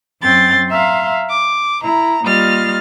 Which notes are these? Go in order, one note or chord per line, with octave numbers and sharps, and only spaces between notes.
F#2 C4 C6 A6
E5 F5 A#5 C6
D6
E4 A#5
G3 A#3 F4 D#5 F6 A6